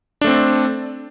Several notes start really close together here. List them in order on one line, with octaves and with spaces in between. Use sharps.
D4 A3 C4